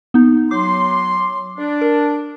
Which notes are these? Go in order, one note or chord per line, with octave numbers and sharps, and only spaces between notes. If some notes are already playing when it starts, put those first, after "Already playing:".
B3 D#4
F#3 C6 D6
D4
A#4